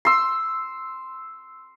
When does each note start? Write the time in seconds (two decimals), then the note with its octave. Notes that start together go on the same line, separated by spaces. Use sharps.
0.05 C6 E6